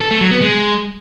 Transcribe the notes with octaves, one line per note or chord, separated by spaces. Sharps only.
A4
A3
F#3
B3
G#3